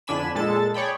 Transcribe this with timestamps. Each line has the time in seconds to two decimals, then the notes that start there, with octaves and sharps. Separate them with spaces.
0.07 F2 D3 D4 G#5 B5 E7
0.35 A#2 G#3 A4 A5 A6
0.74 G#4 C#5 D5 G5 B5